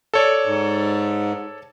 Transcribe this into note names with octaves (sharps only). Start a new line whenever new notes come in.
A4 C#5 D5
G#2